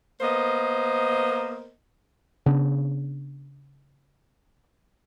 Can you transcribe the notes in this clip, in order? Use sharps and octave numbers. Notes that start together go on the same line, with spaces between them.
A#3 B3 A#4 C5 D#5
C#3 B3 D4